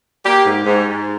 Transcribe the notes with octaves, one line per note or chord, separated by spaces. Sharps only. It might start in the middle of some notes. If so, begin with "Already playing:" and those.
A#3 G4
G#2
G#2
G#2